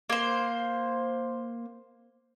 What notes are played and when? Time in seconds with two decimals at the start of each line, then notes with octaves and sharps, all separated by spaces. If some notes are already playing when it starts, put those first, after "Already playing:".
0.10 A#3 C5